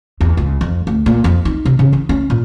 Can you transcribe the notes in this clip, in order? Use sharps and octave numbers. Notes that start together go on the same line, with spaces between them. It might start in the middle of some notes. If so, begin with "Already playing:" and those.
E2
C#2
F2
D2
A#2
F2
D#4
C3
C#3
E3
C#4
A#2